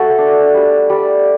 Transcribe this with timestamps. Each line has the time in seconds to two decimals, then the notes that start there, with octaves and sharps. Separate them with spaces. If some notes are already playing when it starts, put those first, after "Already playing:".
Already playing: A3 F#4 A4
0.18 D4
0.54 G3
0.90 G3